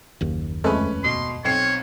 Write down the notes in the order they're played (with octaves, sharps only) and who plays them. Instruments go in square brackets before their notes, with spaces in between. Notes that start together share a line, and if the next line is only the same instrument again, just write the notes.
[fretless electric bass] F#1 D#2
[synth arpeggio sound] F2 G#3 A3 [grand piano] C#4 B4
[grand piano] B2 [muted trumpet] C6
[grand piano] B1 C4 C7 [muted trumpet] C#5